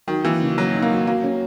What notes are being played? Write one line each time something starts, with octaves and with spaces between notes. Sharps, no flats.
D#3 F#3
E3 A#3
C#3
F#3 A#3
D#4
A#3
F#3
F#3 A#3
C#4